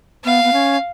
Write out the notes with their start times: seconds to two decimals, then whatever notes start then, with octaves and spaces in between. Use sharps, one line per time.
0.25 B3 F5
0.44 B3
0.53 C#4